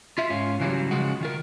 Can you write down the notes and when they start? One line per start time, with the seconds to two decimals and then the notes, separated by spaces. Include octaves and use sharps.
0.18 F4 E5
0.30 G#2 C#4 F4
0.60 C#3 E3 F#3 G3
0.91 C#3 F3 G#3 F#4
1.21 D#3 F4 A#4